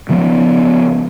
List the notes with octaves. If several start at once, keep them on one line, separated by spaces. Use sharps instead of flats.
C#3 F3 B3